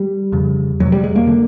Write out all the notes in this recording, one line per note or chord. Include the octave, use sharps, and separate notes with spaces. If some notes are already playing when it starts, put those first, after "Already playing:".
Already playing: G3
F2 C#3
F2 C3 F#3
G3
G#3
A#3
D3